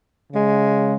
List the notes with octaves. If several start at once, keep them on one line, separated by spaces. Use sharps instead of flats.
C#3 G#3